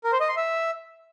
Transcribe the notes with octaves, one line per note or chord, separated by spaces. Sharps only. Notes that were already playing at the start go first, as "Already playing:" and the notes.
A#4
C5
D#5
C6
E5